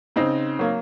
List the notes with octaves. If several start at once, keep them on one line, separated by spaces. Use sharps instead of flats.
C#3 C4 D#4
F#3 A#3